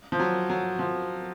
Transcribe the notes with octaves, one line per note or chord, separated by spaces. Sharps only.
F3
F#3
F#3
F3